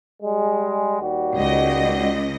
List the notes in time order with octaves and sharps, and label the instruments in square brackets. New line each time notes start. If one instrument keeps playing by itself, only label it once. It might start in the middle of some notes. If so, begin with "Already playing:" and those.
[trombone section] G3 G#3
D#2 G3 F#4
[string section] C#2 D#5